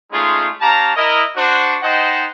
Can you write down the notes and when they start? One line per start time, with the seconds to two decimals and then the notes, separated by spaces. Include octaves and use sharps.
0.12 G#3 A3 C#4 D#4 F4 G#4
0.61 C#4 G4 F5 A5 A#5
0.96 E4 A#4 D#5
1.36 D4 F#4 C5
1.83 D#4 C5 D#5 F#5 G5 A5